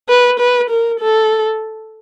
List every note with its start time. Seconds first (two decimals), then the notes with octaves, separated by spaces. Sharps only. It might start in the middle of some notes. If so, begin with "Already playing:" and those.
0.09 B4
0.40 B4
0.70 A#4
1.00 A4